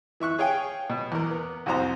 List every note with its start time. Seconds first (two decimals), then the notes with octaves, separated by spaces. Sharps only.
0.20 E3 E5 C#6 F#6
0.39 G#4 C#5 F5 G5 G#5
0.90 B2
1.12 E2 A#4
1.31 B3
1.66 C2 F2 F#4 C5 A#5